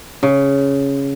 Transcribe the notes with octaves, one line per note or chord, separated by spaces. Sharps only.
C#3